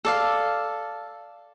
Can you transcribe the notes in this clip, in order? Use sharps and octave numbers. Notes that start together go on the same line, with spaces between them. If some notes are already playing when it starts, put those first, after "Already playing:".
A4 D5 F5